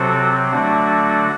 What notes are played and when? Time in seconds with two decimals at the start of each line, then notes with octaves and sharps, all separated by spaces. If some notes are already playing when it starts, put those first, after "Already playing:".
Already playing: C3 F#3 C4 F#4 A4
0.51 D3 F#3 A3 D4 F#4